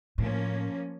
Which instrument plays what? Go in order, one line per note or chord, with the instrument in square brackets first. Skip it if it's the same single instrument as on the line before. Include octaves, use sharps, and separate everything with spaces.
[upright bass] A2 [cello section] F3 A#3 C#4